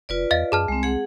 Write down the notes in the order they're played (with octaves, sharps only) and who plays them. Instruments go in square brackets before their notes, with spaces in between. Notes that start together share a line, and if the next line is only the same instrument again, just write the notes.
[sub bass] F1 [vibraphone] F4 B4 D5
[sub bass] E2 [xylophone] D#5 F5 A6
[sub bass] F#2 [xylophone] G#4 A5 F6
[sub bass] C2 [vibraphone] G#3 C4
[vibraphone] G#4 F#5 [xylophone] C#7